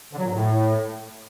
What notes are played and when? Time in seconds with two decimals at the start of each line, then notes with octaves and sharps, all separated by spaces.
0.13 D3
0.19 F#3
0.24 A#2
0.29 G#2
0.35 A2